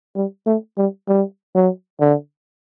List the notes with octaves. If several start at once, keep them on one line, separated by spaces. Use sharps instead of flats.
G3
A3
G3
G3
F#3
D3